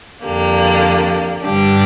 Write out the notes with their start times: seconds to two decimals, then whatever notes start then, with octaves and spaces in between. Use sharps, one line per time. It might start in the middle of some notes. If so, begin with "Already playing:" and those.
0.24 F2 D3 A#3 G4
1.43 G2 D3 G3 D4 G4